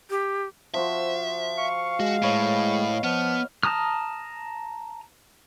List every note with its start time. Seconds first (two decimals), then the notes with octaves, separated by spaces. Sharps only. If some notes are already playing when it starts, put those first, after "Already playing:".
0.10 G4
0.74 F3 F#4 C5 E5
1.57 F5 C#6
2.00 G#3 F#4
2.23 A2 B4 C#5 D#5
3.04 F3 B3 F6
3.63 A5 A#5 D#6 F6